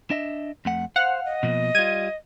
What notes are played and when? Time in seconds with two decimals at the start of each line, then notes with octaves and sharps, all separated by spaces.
0.10 D4 D#5 E5
0.65 F2 A3 F#5
0.96 C5 F5 F#5
1.25 D#5
1.43 B2 F3 A#3
1.75 G3 F4 G#6 D#7